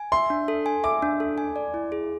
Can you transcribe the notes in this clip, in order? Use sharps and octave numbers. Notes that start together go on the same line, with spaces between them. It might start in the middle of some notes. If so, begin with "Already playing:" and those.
Already playing: G#5
E5 C6
D4
A4
G#5
E5 D6
D4
A4
G#5
D5
E4
G#4